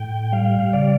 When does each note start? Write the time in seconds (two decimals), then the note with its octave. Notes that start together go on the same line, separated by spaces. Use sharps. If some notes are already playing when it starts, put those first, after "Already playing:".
Already playing: A2 G5
0.32 G3 F5
0.73 C#3 D5